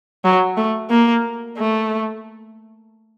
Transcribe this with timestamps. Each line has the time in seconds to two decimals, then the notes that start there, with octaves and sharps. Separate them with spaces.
0.24 F#3
0.57 A3
0.90 A#3
1.58 A3